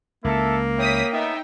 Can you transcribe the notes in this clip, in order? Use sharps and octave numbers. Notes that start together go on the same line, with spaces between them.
C#2 A#3 E4 A4
E4 C#5 G5 D#6 B6
A3 B3 D#4 E5 G5